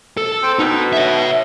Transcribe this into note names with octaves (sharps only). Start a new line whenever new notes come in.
A4
C4
B2 D#4
C#5 E5